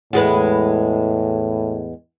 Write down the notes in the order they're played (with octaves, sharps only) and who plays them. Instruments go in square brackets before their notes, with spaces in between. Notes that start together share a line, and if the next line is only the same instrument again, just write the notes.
[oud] E2 G#3 B4 [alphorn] A2